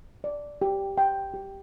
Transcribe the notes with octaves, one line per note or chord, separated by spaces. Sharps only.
D5
G4
G5
G4